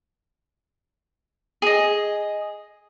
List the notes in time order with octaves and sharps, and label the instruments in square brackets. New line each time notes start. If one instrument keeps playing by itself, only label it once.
[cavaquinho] G#4 D#5